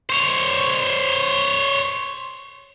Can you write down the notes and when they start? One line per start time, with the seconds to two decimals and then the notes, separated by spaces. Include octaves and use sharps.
0.10 C5 C#5